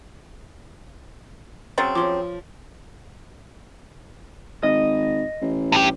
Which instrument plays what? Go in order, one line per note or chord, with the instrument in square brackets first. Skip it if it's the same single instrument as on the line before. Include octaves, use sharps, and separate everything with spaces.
[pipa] C#3 F#3 C4 [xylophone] A6
[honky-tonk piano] F3 [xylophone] C#5 C6 D6
[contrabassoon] G#1 [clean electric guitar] D#5
[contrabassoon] A1
[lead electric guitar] G2 G4